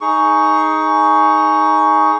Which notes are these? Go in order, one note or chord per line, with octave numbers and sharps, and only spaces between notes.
D#4 G#4 C#6